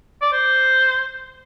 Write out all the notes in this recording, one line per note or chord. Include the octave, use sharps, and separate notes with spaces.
D5
C5